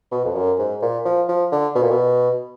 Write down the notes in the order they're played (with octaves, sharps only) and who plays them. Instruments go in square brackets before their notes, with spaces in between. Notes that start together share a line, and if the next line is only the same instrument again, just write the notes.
[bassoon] B2
F2
F#2
G#2
A#2
F3
F3
D3
B2
A#2
B2